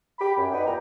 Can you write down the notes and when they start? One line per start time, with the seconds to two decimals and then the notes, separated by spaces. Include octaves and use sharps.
0.19 G4 B5
0.37 F#2
0.52 D#4 B4 D5 F#5 G5
0.66 E2 A#2 G5 A#5